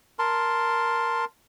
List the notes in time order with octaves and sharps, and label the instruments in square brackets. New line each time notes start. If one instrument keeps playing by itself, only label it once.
[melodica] A#4 A5 C6